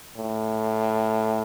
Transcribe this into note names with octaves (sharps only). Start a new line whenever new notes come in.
A2